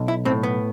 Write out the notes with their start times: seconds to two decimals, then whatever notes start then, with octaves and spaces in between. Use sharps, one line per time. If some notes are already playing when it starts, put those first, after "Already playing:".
Already playing: B1
0.08 E4
0.25 A2 C4
0.43 B3